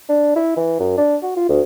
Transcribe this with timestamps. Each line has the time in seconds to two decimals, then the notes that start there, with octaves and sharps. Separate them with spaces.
0.09 D4
0.36 E4
0.57 E3
0.80 F#2
0.97 D4
1.23 F#4
1.36 F4
1.49 D2